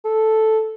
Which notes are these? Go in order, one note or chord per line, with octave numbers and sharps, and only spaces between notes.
A4